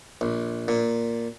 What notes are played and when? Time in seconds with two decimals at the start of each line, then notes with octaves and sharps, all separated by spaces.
0.21 A#1
0.68 A#2